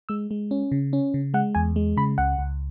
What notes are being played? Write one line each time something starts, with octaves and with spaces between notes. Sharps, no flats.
G#3 E6
G#3
C#4
C#3
C#4
C#3
G#3 F#5
E2 G#5
G#3
C#3 B5
C#2 F#5
C#2